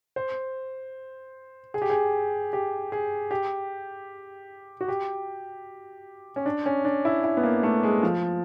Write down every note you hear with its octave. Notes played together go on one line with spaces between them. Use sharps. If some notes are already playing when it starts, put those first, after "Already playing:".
C5
G#4
G4
G#4
G4
G#4
G4
F#4
G4
C#4
D4
C#4
D4
E4
E4
B3
A#3
A3
G#3
F3